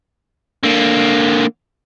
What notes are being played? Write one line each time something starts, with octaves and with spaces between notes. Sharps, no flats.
D3 A#3